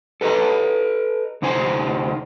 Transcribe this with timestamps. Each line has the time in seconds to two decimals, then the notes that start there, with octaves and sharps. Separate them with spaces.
0.21 A4 B4 C5 D#5 A#5
1.42 D2 C3 D#4 F4 C5 G#5